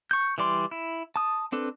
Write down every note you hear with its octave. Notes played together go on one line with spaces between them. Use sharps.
C#6 G6
E3 G3 D5 C6
E4
A5 D#6
C4 D4 A4 B4